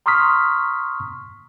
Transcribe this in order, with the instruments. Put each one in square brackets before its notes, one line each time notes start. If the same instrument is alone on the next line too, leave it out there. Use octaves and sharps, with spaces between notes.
[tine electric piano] A#5 C6 C#6 D#6 F6 B6